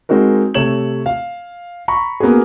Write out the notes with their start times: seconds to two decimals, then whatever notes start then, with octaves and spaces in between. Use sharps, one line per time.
0.09 G#3 C4 D#4 F#4 A#4
0.54 C3 A3 C#5 E7 F#7
1.06 F5
1.88 A#5 B5 C#6
2.20 A#3 B3 C#4 F#4 G#4